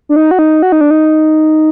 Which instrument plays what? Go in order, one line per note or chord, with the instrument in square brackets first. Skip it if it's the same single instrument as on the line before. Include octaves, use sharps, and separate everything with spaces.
[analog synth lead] D4
D#4
F#4
D#4
F#4
D#4
D4
D#4